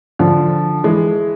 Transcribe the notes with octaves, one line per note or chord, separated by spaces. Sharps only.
D3 F3
E3 G#3